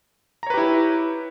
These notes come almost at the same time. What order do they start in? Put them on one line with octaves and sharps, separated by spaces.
A#5 C#5 B4 G4 E4